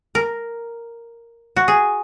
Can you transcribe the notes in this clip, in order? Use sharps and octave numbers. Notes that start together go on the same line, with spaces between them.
A#4
F#4
G#4